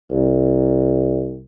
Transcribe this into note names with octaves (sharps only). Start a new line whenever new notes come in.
C2